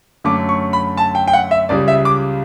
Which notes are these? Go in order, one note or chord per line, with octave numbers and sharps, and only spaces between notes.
F#2 D3 A3 C#4 D6
C#6
B5
A5
G5
G5
F#5
E5
C#2 C#3 G3 D5
E5
D6